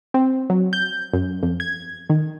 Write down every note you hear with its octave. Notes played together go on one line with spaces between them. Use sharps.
C4
F#3
G6
F#2
F2
G#6
D#3